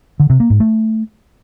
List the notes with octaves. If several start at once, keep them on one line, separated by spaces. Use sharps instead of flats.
D3
C3
A#3
G#2
A3